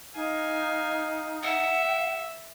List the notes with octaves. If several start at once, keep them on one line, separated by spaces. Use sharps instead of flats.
D#4 F5 G#5
E5 F#5